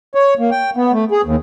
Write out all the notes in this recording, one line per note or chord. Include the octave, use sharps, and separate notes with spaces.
C#5
A#3
G5
B3
A3
G#4
D#2